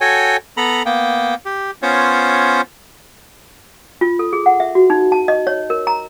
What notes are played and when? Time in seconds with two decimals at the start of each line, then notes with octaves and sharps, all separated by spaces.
0.01 F#4 A4 C#5 G5 G#5
0.57 B3 A4 A#5 B5
0.86 A#3 B3 G5
1.45 G4
1.82 B3 C#4 F4 C5 C#5
4.01 F4
4.19 A4
4.33 G#4
4.46 F#5
4.60 E5
4.75 F#4
4.90 D#4
5.12 A5
5.28 D#5
5.47 C#5
5.70 A#4
5.87 A#5